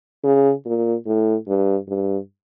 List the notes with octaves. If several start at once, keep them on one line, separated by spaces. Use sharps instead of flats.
C#3
A#2
A2
G2
G2